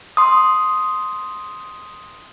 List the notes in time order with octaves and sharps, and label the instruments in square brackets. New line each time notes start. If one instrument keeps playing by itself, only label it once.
[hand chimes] C6 D#6